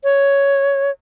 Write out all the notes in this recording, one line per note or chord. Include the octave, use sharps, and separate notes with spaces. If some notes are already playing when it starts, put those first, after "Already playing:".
C#5